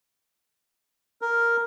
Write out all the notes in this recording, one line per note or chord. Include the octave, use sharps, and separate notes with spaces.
A#4